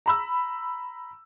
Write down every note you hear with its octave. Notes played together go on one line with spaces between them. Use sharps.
A#5 B5 E6